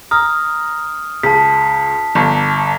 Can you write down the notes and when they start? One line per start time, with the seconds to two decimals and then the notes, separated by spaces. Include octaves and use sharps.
0.11 A#5 D#6 F6
1.23 C#2 A5 B6
2.15 G1